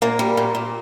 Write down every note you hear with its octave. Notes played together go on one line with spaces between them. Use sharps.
A#2 A#3
G3
A#2
A#2